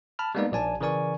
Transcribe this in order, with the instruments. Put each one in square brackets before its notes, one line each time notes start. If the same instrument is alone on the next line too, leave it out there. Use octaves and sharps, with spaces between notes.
[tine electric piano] A5 B5 F6
G3 G#3 A#3 B3 D#4 D5
A#1 D5 G#5 A5
C#3 E3 A#4 D5 G#5 C#6